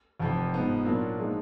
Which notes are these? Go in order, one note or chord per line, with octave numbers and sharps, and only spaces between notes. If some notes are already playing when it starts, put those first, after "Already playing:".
F1 F2 F3
G#2 F3 B3 D#4
A#2 F#3 A#3 D4 F4
F3 G#3 D#4